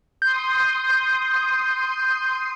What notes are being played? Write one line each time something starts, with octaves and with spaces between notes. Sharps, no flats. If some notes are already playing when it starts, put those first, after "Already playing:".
C6 D#6 G6